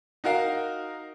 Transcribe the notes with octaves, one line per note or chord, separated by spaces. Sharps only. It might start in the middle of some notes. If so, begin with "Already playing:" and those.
D#4 F#4 A#4 F5